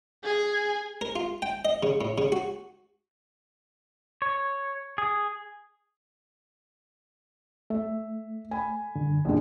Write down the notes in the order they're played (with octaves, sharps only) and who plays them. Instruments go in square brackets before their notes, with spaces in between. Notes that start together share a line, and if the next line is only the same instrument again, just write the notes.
[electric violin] G#4 G#5
[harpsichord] A#4
F4
G5
D#5
C#3
A2
C#3
F#4
[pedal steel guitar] C#5
G#4
[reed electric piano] A3 [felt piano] E5
[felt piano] G#5 B5
[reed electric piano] G2 D3
[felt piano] A#1 G#3 [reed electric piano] E2 D4